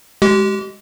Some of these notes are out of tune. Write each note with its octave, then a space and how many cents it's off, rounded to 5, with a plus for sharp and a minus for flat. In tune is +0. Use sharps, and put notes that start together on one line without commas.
G#3 +0 G4 -35